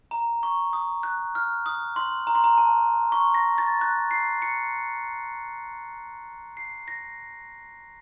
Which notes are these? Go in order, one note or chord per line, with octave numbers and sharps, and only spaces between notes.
A#5
C#6
D#6
F#6
F6
D#6
C6
A#5
C6
A#5
A5
C#6
A#6
A6
F#6
C7
C#7
C7
A#6